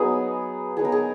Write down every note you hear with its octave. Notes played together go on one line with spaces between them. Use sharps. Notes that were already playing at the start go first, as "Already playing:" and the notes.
Already playing: F#3 B3 D#4 G#4
F#3 B3 D#4 G#4
A#4
G#4